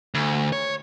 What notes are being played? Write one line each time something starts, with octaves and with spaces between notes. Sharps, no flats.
D2
C#5